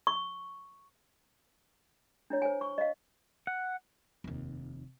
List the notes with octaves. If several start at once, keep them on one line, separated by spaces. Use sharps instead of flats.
C#6
D4 E4 C#5
C5 G#5
C#6
D#5 F5
F#5
F1 D#2